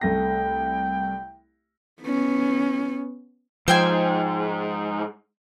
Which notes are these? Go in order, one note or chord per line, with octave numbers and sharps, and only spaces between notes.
C2 A3 G5 A#6
B3 C#4
G#2 F3 C5 G5 G#5